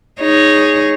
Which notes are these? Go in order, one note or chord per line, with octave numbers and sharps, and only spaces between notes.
D#4 G#4 C#5